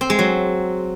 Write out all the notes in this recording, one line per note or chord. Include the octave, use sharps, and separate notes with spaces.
C4
G#3
F#3